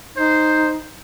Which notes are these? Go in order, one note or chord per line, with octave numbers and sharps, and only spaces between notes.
D#4 C5